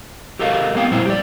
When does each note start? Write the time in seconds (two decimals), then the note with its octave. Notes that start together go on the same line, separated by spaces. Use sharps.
0.39 G4 A4 A#4 D#5 F5
0.75 A#3 B3 F5 G5
0.91 F2 A#2 G3 E4 C5
1.06 G4 D5